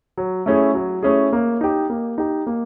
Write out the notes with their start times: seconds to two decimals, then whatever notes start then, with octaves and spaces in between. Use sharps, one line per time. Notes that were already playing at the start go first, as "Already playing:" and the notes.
0.18 F#3
0.46 A3 C#4 E4 G#4
0.75 F#3
1.03 A3 C#4 E4 G#4
1.33 A#3
1.61 D#4 G4
1.90 A#3
2.18 D#4 G4
2.47 A#3